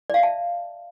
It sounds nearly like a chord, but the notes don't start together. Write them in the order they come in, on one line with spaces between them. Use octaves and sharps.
D5 F5 E5 A5